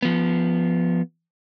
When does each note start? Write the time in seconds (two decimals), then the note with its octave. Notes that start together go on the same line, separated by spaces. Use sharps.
0.03 F3 B3